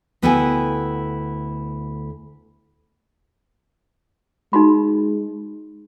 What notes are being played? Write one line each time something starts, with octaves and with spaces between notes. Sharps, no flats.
D2 B3 E4 A4 G5 G#5
G#3 D#4 F#4 B5